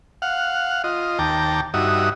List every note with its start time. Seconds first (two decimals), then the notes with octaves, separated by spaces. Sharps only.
0.22 F5 F#5
0.84 F4 D#5
1.19 D#2 G5 A5 A#5 D6
1.74 G2 D#4 F#4 E5 D#6